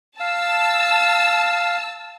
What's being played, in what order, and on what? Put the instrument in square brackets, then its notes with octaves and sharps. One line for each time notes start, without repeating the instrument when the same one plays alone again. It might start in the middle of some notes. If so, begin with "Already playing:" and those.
[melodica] F5 [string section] A5 E6